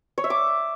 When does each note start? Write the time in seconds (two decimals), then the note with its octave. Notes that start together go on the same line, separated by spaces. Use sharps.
0.18 C#5
0.24 E5
0.30 D6